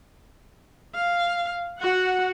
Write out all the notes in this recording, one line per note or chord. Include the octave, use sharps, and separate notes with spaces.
F5
F#4 F#5